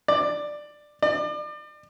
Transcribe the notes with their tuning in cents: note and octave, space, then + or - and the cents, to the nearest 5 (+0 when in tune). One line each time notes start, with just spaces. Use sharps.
D5 +10
D5 +35